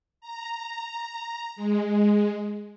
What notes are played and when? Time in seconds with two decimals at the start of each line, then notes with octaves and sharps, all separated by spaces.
0.21 A#5
1.56 G#3